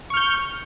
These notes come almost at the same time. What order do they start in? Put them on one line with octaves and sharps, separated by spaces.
C#6 F6 G6